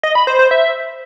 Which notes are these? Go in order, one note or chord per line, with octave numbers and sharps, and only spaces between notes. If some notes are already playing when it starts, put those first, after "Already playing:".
D#5
B5
C5
C5
E5